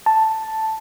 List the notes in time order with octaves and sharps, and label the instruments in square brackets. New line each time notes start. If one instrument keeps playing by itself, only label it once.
[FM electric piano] A5